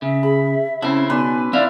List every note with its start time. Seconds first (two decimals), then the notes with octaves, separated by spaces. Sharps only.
0.02 C#3 E5
0.23 G#4 B5
0.82 C#3 C4 C#4 E4 A4
1.10 B2 D#4 B4 D5 G#5 C6
1.53 C4 E4 D5 E5 F5